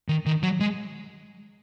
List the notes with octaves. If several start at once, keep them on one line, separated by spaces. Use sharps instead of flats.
D#3
D#3
F#3
G#3